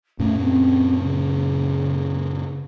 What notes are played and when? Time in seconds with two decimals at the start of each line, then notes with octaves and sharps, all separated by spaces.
0.19 F#2 A#2 A3 C#4
0.42 C4
1.00 C#3